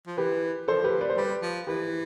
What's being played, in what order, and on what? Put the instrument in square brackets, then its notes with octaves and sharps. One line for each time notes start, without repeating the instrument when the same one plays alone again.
[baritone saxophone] F3
[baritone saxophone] E3 [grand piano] G4 B4
[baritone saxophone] F3 [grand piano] A4 C5
[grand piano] G4 B4
B4 D5
C5
[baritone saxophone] G3 [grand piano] G4 B4
[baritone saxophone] F3
[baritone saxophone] E3 [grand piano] G4 B4